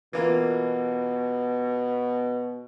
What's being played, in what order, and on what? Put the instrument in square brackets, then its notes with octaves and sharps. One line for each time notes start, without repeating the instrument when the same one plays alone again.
[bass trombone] B2 [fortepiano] E3 A#3 F4